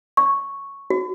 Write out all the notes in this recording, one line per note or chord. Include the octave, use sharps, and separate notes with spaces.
C#6
F#4